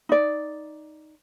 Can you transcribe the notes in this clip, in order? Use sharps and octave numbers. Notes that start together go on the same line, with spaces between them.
D#4 D5